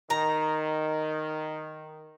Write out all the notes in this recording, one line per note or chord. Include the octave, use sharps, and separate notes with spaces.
D#3 A#5